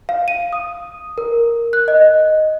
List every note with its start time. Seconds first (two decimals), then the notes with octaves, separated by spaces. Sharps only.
0.09 F5
0.28 D#7
0.53 D#6
1.18 A#4
1.73 F#6
1.88 D#5